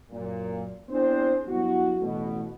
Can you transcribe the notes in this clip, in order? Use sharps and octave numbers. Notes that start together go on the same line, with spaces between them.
F#2 A#2
B3 C4 D4 E4 G#4 C5
G2 F#3 B3 E4 F#4
A1 B2